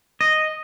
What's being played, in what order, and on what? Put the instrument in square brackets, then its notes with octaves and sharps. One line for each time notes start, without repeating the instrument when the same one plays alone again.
[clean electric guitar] D#5